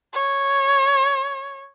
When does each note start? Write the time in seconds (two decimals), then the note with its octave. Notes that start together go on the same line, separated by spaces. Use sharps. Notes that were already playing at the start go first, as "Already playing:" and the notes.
0.13 C#5